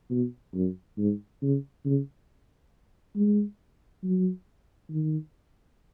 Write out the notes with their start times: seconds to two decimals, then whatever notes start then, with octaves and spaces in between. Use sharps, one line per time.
0.10 B2
0.54 F#2
0.98 G#2
1.42 C#3
1.85 C#3
3.16 G#3
4.03 F#3
4.90 D#3